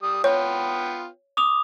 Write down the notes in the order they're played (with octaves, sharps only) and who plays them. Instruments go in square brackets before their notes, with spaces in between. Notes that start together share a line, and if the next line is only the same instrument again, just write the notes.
[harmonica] G3 D#6
[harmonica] B3 F4 G5 [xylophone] C#5
[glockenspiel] D6 D#6 F7